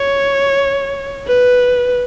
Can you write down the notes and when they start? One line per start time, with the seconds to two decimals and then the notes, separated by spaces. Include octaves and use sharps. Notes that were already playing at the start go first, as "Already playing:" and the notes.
Already playing: C#5
1.27 B4